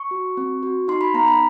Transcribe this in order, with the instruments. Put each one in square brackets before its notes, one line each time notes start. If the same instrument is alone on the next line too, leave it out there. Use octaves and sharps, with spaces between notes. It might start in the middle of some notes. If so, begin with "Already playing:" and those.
Already playing: [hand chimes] C#6
F#4
C4
F#4
D#4 C6
B5
B3 A#5
B5